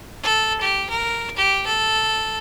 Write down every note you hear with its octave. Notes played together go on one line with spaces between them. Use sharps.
A4
G4
A#4
G4
A4